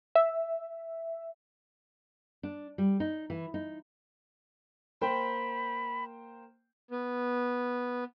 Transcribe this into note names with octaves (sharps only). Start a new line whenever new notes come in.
E5
D4
G3
D#4
E3
D#4
A#3 C5 G5 B5
B3